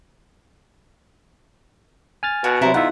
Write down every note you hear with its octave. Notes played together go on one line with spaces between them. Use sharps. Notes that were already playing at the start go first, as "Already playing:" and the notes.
G#5 F6 A6
B2 F#4
C3 F#3 E4 C5 A#5
E2 D#4 F4 E5 F#5